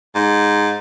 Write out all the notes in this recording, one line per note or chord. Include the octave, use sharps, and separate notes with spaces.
G#2